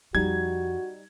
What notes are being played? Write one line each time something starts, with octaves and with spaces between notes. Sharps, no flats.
F2 F3 G3 D#4 F#4 G#6